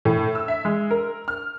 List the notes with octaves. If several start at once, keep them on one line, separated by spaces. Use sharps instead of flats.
A2
E6
E5
G#3
A#4
F6